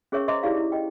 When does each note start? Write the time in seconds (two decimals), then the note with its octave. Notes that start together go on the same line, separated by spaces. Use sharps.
0.12 C#4 G#4 A#4 C#5 E5 C#6
0.28 C5 D#5 E5 A#5 C6 D6
0.43 D#4 E4 G4 G#4 D5 F5
0.56 E4
0.72 D#5 G5